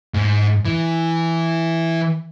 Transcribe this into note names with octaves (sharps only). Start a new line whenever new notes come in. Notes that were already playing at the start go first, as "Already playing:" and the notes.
G#2
E3